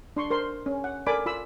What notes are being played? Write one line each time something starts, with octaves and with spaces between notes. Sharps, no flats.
D4 C6 C#6
A#4 C5 C6
C#4
F#5
A4 A#4 D5 G#5 B5 D6
F4 B5 E6